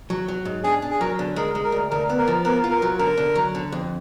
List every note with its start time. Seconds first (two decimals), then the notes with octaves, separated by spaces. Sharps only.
0.10 F#3
0.28 F#3
0.45 G#2
0.63 D4 G#4
0.82 D4
0.91 G#4
1.00 F#3 A#4
1.19 D3
1.36 G#3 A#4
1.55 G#3
1.64 A#4
1.72 D2
1.90 D2 A#4
2.09 B3
2.18 A#4
2.27 F3
2.45 B3 A#4
2.64 F4
2.71 A#4
2.82 F#3
2.98 D3 A#4
3.18 D3
3.35 F#3
3.55 D3
3.72 F2